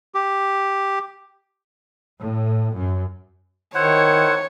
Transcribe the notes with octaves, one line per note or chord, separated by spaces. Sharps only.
G4
A2
F#2
D#3 E4 C5 C#5 F#5